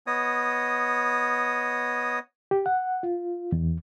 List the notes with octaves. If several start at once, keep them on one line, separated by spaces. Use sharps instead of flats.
B3 C#5 D#5 D#6
G4
F#5
F4
E2